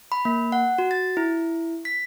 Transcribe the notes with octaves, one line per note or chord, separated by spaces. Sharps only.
B5
A#3
F#5
F#4
A6
E4
B6